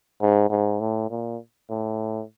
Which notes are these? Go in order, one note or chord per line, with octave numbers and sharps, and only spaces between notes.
G#2
G#2
A2
A#2
A2